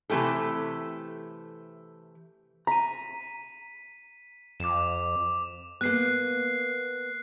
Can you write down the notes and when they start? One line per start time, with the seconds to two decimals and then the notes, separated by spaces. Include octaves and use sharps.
0.10 C3 E3 A3 G4 A4
2.67 A#5 B6 D#7
4.60 F2 D6 E7
5.81 A#3 B3 F#6 C7